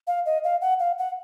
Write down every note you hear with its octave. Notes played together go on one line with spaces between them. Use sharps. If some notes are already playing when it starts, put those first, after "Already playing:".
F5
D#5
F5
F#5
F5
F#5